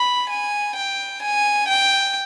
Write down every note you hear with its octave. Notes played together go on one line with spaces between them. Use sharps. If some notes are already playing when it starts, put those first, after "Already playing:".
Already playing: B5
G#5
G5
G#5
G5